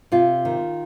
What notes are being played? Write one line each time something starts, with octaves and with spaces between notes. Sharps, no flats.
C3 F4
D#3